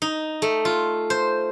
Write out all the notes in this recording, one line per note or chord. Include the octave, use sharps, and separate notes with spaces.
D#4
A3
F4
C5